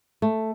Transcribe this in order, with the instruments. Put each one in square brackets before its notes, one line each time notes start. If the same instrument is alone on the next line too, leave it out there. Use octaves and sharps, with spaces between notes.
[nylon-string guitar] A3